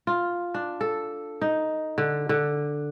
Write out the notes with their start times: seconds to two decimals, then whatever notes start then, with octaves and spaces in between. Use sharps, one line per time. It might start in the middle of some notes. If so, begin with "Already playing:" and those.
0.07 F4
0.54 D4
0.81 A4
1.42 D#4
1.98 D3
2.29 D3